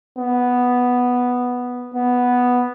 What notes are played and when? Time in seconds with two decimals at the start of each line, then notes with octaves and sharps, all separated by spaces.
0.18 B3
1.94 B3